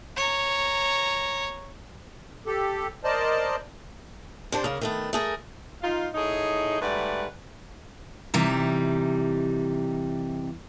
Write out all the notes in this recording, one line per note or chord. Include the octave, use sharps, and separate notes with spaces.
C#5 A#5
G4 A4
A#4 C5 D5 D#5 A5
C3 D4 C5
C#3 A#3
D#3 A3 B3
A3 G#4 A#4
D#4 F4 F5
A2 D#4 G#4
G#2 G3 A3 B4 D5 F#5
C3 E3 G3 D#4